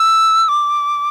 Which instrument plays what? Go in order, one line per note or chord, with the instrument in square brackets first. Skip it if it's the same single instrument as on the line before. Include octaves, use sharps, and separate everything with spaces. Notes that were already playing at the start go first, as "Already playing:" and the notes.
Already playing: [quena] E6
D6